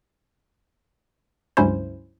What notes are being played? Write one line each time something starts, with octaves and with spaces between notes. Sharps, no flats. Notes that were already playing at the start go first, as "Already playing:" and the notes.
C#2 G2 F#3 C#4 E4 C5